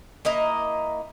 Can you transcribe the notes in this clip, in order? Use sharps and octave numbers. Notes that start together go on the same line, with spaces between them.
A#3 E4 D#5 A#5